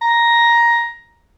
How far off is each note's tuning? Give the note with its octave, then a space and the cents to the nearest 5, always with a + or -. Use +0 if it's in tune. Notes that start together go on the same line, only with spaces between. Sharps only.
A#5 +10